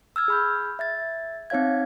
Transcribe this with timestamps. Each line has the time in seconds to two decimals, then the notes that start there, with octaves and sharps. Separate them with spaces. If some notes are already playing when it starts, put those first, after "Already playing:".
0.16 E6 F6 G#6
0.28 G#4 B5 G6
0.79 E5 G#6 A6
1.50 C4 D#4 C#5 F5 G#6